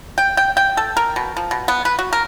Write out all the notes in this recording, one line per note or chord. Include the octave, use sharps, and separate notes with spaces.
G5
G5
G5
A4
A#4
B2
F3
B2
B3
B4
F#4
A#4